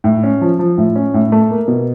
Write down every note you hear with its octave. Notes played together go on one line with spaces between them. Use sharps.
A2
C#4
F3
F3
A2
C#4
A2
A3
A#3
B2